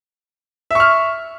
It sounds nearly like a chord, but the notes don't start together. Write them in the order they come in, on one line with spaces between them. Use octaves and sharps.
E5 C#6 F6